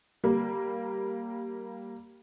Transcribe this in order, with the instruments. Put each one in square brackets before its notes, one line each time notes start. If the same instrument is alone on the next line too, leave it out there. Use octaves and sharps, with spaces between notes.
[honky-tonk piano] G3 A#3